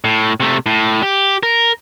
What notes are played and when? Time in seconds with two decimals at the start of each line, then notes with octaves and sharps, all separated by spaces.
0.04 A2
0.40 C3 A3
0.66 A2
1.03 G4
1.43 A#4